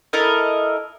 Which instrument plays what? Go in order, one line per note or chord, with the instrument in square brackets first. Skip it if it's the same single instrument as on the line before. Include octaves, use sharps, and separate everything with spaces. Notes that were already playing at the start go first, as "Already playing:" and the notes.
[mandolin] E4 A4 A#4 D#5